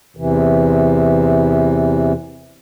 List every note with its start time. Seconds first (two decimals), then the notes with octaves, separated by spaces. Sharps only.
0.17 E2 C3 E3